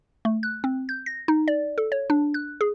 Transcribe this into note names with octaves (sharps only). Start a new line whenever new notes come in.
A3
F#6
C4
G6
A#6
D#4
D5
A4
C#5
D4
F#6
G#4